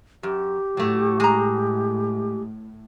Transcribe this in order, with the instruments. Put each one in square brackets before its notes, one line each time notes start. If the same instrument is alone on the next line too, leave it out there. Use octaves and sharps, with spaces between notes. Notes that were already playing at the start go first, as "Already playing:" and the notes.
[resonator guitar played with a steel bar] F#2 [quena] G4
[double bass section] A2 [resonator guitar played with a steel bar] F#3 A3
[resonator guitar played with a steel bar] G#3 A#5